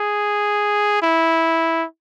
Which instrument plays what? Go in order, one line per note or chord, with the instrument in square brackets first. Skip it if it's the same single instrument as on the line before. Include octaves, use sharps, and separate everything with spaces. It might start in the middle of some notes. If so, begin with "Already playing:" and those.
Already playing: [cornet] G#4
E4